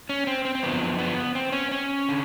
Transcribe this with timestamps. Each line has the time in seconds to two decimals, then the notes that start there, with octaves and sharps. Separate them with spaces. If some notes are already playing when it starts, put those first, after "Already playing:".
0.09 C#4
0.27 C4
0.45 C4
0.55 C4
0.63 F#2 D3 F3 B3
0.99 B3
1.35 C4
1.52 C#4
1.72 C#4
2.09 D3